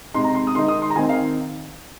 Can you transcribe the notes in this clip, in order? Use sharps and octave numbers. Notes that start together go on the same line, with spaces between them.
C3 G#3 D#4 C6
A#5
C6
D#6
D#3 G#3 D#4 C6
D#6
C6
A#5
D#3 C4 D#4 G#5
F5